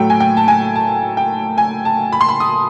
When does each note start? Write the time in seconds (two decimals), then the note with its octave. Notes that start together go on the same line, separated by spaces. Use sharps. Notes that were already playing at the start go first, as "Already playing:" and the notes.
Already playing: A2 F#3 A3 G5
0.10 G#5
0.20 G5
0.37 A5
0.48 G#5
0.76 A5
1.17 G5
1.58 G#5
1.85 A5
2.13 B5
2.21 C6
2.29 B5
2.40 D#6